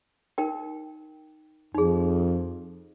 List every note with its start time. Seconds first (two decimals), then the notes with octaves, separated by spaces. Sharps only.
0.38 D#4 A#4 G5
1.75 F2 D#4 G#4